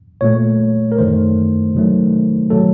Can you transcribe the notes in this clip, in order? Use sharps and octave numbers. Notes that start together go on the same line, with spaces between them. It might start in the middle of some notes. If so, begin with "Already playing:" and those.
A#2 A3 C#5
A#4
F#2 D#3 A3 C5
C3 D#3 F#3 A3
C3 F#3 A3 A4